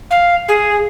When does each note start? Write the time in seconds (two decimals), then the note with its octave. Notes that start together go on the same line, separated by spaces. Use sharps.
0.10 F5
0.48 G#4